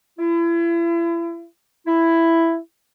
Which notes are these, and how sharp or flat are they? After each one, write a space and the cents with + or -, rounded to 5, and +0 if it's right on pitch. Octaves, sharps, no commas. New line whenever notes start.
E4 +35
E4 +5